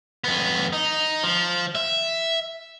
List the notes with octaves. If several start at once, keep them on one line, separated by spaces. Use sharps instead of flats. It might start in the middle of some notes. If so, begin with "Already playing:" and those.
F2 B3
D#4
F3
E5